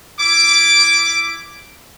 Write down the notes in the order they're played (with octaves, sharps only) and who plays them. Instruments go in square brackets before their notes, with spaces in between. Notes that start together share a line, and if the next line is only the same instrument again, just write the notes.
[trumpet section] E4 D6